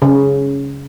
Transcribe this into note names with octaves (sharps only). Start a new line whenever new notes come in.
C#3